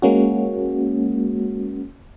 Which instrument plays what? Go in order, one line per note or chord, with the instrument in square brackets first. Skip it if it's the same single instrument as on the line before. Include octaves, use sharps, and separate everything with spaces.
[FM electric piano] G#3 A#3 C#4 F#4